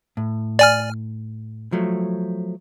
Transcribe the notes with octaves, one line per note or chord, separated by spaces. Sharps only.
A2
D5 G#5 F6
F3 F#3 A3